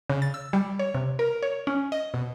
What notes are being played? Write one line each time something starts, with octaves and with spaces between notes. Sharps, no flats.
C#3
A6
E6
G3
C#5
C3
A#4
C#5
C#4
D#5
B2